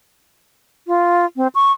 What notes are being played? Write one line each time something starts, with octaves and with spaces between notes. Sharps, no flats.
F4
C4
C#6